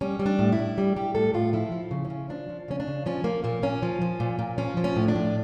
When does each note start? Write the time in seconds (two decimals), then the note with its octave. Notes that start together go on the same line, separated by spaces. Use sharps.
0.01 G3 C#4
0.19 G3
0.26 D4
0.39 A2
0.52 E4
0.59 A2
0.78 G3
0.96 G3 G4
1.15 A2 A4
1.34 A2 F4
1.53 F3 E4
1.72 F3
1.91 C#3
2.05 C#4
2.10 C#3
2.30 F3 D4
2.49 F3
2.68 C#3 C#4
2.80 D4
2.87 C#3
3.06 F3 C#4
3.24 F3 A#3
3.44 A#2 A#3
3.62 A#2 C#4
3.83 F3
4.02 F3
4.20 A#2
4.39 A#2
4.58 F3 C#4
4.77 F3
4.84 C#4
4.96 A2
5.08 D4
5.15 A2